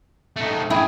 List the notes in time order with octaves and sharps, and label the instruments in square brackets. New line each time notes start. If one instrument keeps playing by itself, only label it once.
[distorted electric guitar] A3 D#4
[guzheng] E4 [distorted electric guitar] G#4 G5